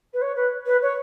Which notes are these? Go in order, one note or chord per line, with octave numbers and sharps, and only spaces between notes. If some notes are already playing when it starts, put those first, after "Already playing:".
B4
C#5
B4
B4
C#5